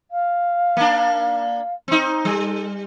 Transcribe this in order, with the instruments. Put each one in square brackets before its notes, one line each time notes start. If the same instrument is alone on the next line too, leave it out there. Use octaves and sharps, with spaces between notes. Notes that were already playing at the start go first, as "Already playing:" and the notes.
[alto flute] F5
[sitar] A#3 D4
C4 D#4
[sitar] G3 [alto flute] A4